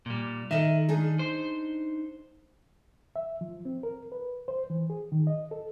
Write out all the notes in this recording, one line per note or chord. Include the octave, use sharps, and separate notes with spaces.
A#2 G3
D#3 A4 D#5 E5
D4 D#4 G#4
C5
E5
F3
C4
A#4
B4
C5
E3
G#4
D#3
D#5
A4